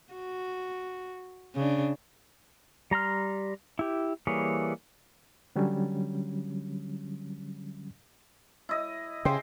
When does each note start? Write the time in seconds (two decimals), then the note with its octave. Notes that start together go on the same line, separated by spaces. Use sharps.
0.14 F#4
1.55 C#3 D4
2.91 G3 A#5 C6 F6
3.79 E4 G4
4.27 E3 G3 A#3 G#4 C#5
5.56 D3 F#3 G3 C#4
8.69 E4 D#5
9.25 C#3 G4 G#4 C5 G5 C7